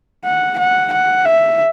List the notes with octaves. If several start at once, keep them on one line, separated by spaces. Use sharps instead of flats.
F#5
F#5
F#5
E5